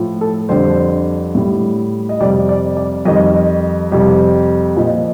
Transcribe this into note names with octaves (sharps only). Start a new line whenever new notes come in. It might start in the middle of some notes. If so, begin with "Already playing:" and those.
Already playing: A2 F3
A4
F2 D3 G3 C5
A2 G3
D#5
F2 C3 G3 D5
D5
D5
F2 D#3 G3 D#5
F2 C3 G3
A#2 F3 D#5